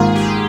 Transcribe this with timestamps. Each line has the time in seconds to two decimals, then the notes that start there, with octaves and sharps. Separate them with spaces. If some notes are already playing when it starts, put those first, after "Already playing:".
Already playing: G#2 D#3 A#3 F4 G#4
0.15 G4